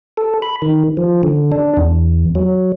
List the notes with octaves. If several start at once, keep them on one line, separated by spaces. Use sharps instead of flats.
A4
B5
D#3
F3
D3
D4
E2
F#3